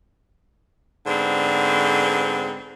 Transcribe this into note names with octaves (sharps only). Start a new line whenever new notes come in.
G#2 D3 B3 C4